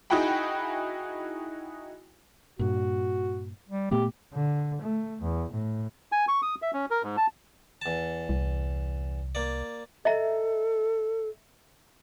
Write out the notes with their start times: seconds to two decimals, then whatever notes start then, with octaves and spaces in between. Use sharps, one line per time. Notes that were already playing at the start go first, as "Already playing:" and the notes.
0.10 D#4 E4 F#4 G#4 G5 B5
2.59 G2 A#2 F#4
3.68 G3
3.91 A#2 A3 B3 G4
4.33 D3
4.81 A3
5.22 E2
5.51 A2
6.12 G#5
6.28 C#6
6.42 D#6
6.62 E5
6.74 C#4
6.91 A#4
7.03 G#2
7.17 A5
7.82 E2 A5
8.29 C2
9.35 A#3 D5
10.05 A4 D#5 E5 A#5